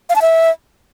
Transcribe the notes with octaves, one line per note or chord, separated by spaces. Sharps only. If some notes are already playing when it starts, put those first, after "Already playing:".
F5
A5
E5